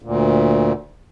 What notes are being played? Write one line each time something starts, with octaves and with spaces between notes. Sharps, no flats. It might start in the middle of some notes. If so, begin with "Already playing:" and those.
D2 A#2